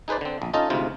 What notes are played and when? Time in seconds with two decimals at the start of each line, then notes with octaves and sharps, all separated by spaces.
0.08 D#4 G#4 B4 C5 D5
0.21 D3 C4
0.42 A#1
0.53 C#4 D#4 F4 A4 D#5
0.70 D2 G#2 C3 F4